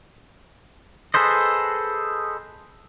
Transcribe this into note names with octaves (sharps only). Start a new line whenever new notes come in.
G#4 A4 B4 C5 D#5